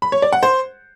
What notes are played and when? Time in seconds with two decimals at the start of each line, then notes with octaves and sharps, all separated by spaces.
0.02 B5
0.12 C#5
0.22 D5
0.33 F#5
0.43 C5